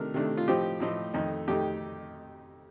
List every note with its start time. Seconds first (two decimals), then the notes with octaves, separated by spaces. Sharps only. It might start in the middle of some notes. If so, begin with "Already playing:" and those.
Already playing: C3 D#3 A3 D4 A#4
0.14 C3 D#3 A3 D4
0.37 F4
0.48 A2 F3 C4 D#4 G4
0.80 A2 F3 C4 D#4
1.14 F2 D#3 A3 D#4
1.48 F2 D#3 A3 D#4 G4